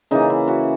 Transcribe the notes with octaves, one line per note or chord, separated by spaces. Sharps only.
C#3 E3 A#3 D#4
E4
F#4